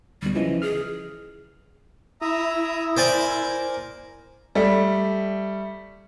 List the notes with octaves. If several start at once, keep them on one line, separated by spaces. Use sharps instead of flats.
D2 B2 G3
C#3 E3 F3 D#5
G#4 F6
E4 E5 A#5 D#6
A#4 C5 D5 G#5
G3 A3